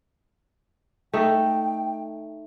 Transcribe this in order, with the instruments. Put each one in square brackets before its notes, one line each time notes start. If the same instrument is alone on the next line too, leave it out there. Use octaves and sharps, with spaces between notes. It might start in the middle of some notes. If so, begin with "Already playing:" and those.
[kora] A3 D#4 [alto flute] G5